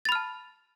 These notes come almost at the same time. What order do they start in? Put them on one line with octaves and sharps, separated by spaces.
A6 B5 F6 A5